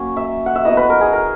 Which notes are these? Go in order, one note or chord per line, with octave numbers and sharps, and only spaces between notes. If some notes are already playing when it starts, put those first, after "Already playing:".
Already playing: F#3 A#3 C#4
E5
F#5
E5
F#3 B3 E4 D#5
B4
A#4
G#4
A#4